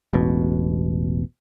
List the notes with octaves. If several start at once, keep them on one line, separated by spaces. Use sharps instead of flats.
E1 A1 B2